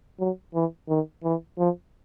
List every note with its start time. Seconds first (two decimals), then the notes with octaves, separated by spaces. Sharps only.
0.19 F#3
0.54 E3
0.89 D#3
1.24 E3
1.58 F3